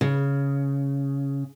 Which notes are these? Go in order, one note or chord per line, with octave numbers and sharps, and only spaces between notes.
C#3